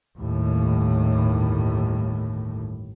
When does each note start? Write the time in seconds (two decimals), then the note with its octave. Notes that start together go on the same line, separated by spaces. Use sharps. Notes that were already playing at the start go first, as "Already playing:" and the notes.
0.17 G1 D#2 A2